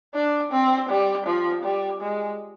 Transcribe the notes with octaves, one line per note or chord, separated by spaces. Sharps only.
D4
C4
G3
F3
G3
G#3